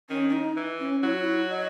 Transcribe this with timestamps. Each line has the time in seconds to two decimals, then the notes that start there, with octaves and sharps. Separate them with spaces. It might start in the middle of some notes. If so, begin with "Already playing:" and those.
0.10 D#3 C#4
0.29 C#4
0.33 D#4
0.56 E3
0.80 C#4
1.03 F#3 E4
1.14 F#4
1.24 E4
1.50 D#5